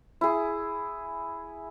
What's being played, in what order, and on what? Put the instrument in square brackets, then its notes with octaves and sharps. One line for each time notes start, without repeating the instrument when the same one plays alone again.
[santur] E4 G#4